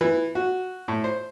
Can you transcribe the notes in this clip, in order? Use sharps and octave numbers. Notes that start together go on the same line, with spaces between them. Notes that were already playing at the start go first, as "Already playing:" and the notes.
E3
F#4
A2
C5